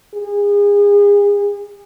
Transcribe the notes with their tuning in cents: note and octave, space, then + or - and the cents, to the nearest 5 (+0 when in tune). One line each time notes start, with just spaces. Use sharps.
G#4 -35